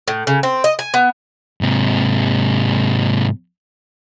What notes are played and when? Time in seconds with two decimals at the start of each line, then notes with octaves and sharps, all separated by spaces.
0.08 A2
0.27 C#3
0.43 C4
0.64 D#5
0.79 G#5
0.94 B3
1.61 G#2 C3